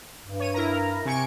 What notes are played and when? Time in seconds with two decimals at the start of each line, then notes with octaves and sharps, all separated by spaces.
0.25 G2
0.40 C#5 D#7
0.54 E4 A#4 A#5
1.05 C3 G#5 C#6 D7